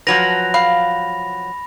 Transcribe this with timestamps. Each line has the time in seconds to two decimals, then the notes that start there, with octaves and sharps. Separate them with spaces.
0.07 F3 F#3 B4 A#6 F7
0.54 F5 B5